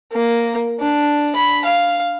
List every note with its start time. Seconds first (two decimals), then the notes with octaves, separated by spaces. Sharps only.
0.12 A#3
0.80 D4
1.36 B5
1.65 F5